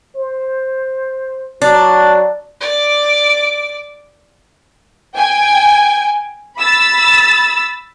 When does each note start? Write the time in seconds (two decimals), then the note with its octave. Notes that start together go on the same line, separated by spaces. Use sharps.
0.16 C5
1.62 F#3 D4
2.60 D5 D6
5.16 G5 G#5
6.58 B5 E6 A6